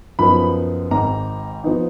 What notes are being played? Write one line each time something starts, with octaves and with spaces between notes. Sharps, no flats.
F#2 F3 B3 D#4 B5
G#1 G#2 D#3 A#5
F3 B3 D#4